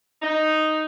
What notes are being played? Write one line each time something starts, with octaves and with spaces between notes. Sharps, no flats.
D#4